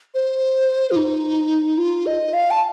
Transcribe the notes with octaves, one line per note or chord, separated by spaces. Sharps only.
C5
F4
D#4
F4
D#5
F5
A5